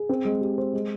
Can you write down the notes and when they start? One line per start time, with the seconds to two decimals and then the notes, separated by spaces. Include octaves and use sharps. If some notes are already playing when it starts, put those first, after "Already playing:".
Already playing: G#4
0.09 C4
0.25 G#3
0.41 G4
0.58 C5
0.74 G#3